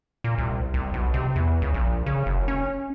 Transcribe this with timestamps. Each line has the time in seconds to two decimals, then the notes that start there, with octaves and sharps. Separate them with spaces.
0.24 A#2
0.38 C2
0.74 C2
0.94 B1
1.14 C3
1.36 E2
1.62 C#2
1.74 A#1
2.06 C#3
2.26 F#1
2.48 C#4